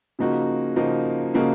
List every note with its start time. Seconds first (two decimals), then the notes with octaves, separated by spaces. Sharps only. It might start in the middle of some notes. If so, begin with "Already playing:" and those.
0.19 C#3 F3 A#3 D#4 F#4
0.76 C#3 F3 A#3 D#4 F#4
1.34 C#3 F3 A#3 D#4 F#4